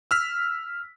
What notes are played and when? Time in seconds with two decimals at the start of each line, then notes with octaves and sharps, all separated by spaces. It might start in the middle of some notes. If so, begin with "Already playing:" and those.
0.11 E6 F6 B6